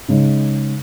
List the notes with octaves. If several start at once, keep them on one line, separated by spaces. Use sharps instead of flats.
C#3 G#3 D#4